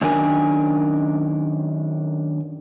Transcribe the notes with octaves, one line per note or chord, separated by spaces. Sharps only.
F#2 D#3 D4 A#4 G#5